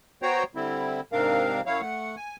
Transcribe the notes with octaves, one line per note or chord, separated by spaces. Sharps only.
B3 F#4 C5 C#5 G5 A#5
D3 G3 C4 E4
G#2 C3 C4 D4 A#4 F5
F#2 F#3 E4 C#5 F5
A3 F#5
G#5